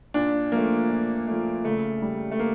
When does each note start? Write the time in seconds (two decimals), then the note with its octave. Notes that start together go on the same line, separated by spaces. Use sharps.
0.14 A#2 D4
0.52 F3 A3 A#3
0.89 A#2
1.27 F3 A3
1.65 C#3 A3
2.02 G3
2.31 A3
2.39 A#3